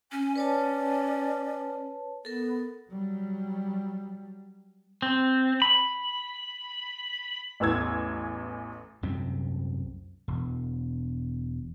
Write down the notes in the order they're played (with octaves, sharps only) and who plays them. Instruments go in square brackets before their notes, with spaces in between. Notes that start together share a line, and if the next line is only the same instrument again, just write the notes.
[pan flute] C#4 [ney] G#5
[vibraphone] B4 C#5 A5 [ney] D5
[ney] B3 [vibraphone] A4 A#4
[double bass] F#3 G3
[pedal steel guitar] C4
B5
[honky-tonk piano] A1 E2 E6 G#6
[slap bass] C2 F#2 C3 C4
E1